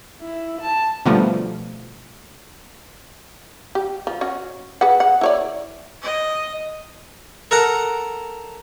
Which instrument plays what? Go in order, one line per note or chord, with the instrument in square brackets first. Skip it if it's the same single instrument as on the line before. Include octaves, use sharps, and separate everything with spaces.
[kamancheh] E4
A5
[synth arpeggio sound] B2 D3 F3 G3 A3
[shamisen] G4
F3
C#4 F#4
G#4 B4 F#5
F#5
E4 C#5 D5
[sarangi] D#5
[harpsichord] A4 A#4 F#5 A#5